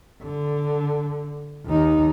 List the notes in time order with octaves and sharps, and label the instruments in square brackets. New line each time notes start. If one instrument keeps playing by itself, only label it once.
[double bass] D3
D#2 D#4